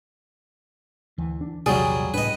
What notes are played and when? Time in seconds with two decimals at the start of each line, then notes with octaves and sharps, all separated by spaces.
1.18 D2 E3
1.41 D4
1.66 A#1 E2 C3 F#3 G3 G#4 D5
2.14 C#2 A2 D4 B4 D#5